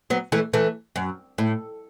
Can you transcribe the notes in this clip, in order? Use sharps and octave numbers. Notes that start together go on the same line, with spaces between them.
F#3 B3
E3 A3
E3 A3
F#2
A2